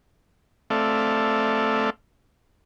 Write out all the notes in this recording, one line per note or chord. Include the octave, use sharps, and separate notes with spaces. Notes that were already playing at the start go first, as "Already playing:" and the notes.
A3 C4 A4 D5 E5 F5